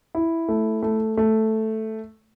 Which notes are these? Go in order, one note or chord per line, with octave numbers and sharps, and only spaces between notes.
E4
A3
A3
A3